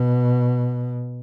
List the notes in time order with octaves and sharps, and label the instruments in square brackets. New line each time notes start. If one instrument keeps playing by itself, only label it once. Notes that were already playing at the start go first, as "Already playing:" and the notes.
Already playing: [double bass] B2